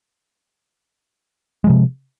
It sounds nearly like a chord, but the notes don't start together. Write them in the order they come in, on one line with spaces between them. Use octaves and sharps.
G#3 F3 C3